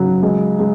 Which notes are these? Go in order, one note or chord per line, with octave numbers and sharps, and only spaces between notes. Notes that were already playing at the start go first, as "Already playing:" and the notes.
Already playing: C#3 F#3
G#3
G#3